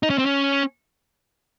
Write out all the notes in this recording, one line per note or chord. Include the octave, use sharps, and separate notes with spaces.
D#4
C#4
C4
C#4